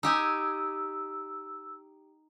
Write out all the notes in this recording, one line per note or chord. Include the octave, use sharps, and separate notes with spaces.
D#4 G4 G#5 E6